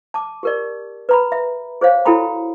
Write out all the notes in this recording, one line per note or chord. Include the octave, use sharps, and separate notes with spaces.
A5 D6
G4 A#4 D5
B4 A#5 B5
E5
G#4 C5 C#5 F5
E4 F#4 A4 G5 A#5 B5